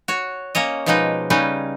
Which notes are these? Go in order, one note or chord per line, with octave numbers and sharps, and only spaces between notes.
F#4 C#5
A#3 C#4 C#5 D#5
B2 F3 G#3 A#3 D#4 B4
C#3 G3 C#4 D#4 B4